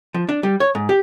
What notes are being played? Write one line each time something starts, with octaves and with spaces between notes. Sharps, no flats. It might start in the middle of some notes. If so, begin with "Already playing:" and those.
F3
D4
G3
C#5
G#2
G4